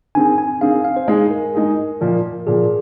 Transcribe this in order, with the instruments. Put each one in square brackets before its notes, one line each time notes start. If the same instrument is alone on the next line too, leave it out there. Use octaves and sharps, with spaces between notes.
[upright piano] D#3 C4 G#4 [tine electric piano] G#5
[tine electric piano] G#5
[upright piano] D#3 C4 G#4 [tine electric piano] F5
[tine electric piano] F5
C5
[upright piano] G#3 D#4 G#4 [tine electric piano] D#5
[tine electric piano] A#4
[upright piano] G#3 D#4 G#4
A#2 F3 A#3
[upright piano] A#2 F3 A#3 [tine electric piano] G#4